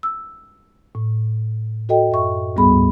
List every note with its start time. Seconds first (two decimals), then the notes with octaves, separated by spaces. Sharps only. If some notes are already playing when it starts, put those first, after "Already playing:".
0.03 E6
0.95 A2
1.89 F#4 A4 D#5 G5
2.09 F#2 E5 C#6
2.56 D2 G#2 G3 B3 G#4 B5